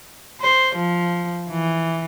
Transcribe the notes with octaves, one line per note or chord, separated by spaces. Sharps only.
C5
F3
E3